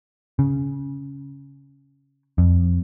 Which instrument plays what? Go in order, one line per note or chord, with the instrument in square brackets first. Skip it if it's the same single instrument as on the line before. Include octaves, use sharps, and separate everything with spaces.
[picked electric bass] C#3
F2